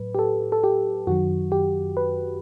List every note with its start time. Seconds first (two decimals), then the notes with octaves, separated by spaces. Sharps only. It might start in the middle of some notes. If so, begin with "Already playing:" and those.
Already playing: A2 F#3 B4
0.15 G4
0.19 A4
0.52 A4
0.64 G4
1.07 F#2 D#3 F#3 F#4
1.52 G4
1.97 B4